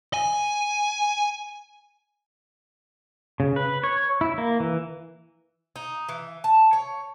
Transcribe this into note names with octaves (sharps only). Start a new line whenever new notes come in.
G#5
C#3
B4
C#5
E4
A#3
E3
D#4
E3
A5
C#5